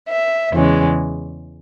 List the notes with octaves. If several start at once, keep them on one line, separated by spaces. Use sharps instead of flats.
E5
E2 C#3 E3 G#3 C#4